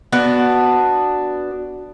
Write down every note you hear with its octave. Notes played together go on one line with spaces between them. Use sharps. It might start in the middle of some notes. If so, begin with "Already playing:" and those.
B3 D4 F#4